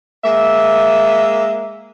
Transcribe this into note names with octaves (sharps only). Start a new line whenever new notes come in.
G#3 A#3 E5